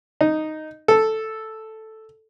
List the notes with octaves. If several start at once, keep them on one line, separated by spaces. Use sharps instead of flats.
D#4
A4